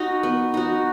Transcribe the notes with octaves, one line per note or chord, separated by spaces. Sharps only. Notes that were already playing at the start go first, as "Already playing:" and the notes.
Already playing: D#4 F#4
B3
D#4 F#4